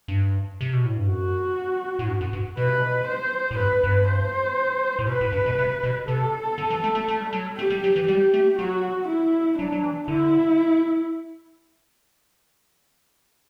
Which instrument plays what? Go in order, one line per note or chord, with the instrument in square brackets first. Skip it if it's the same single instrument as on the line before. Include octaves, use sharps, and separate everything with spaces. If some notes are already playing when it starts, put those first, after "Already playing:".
[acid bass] G2
C3
B2
A2
G2
[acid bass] F#2 [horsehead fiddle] F#4
[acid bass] A2
G2
F#2
G2
[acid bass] B2 [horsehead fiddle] B4
[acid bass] C3
B2
[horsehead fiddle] C5
[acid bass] A2
[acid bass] G2 [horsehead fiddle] B4
[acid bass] G2
[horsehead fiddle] C5
[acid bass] A2
[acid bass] B2 [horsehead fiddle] B4
[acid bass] A2
G2
B2
C3
B2
[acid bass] C3 [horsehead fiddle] A4
[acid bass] D3
E3
A3
A3
A3
G3
F#3
G3
[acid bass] A3 [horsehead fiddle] G4
[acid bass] G3
F#3
E3
[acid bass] G3 [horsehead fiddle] G4
[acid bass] A3
[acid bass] F#3 [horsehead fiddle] F#4
[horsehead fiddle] E4
[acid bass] F#3 [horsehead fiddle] D4
[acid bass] F#3
E3
[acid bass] D3 [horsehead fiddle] E4